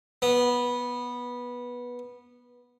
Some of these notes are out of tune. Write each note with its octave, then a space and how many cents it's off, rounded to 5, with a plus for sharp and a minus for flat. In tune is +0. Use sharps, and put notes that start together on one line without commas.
B3 -15